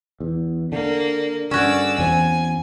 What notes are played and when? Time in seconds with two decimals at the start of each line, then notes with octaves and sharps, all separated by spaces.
0.20 E2
0.72 D3 A#3
1.51 G2 D3 C#4 F#4 D5 E6
1.98 E2 F#3 C4 G#5